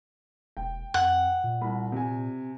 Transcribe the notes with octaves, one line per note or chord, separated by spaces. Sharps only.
E1 G5
F2 F#5
A#2
C2 B5
C3 G#5